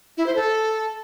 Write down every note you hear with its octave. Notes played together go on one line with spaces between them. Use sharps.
E4
C5
A4